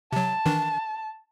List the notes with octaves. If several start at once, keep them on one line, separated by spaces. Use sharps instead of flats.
C3 F#3 A5
D#3 E3 D4